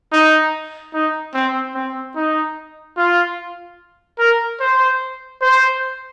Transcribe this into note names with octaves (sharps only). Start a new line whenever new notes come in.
D#4
D#4
C4
C4
D#4
F4
A#4
C5
C5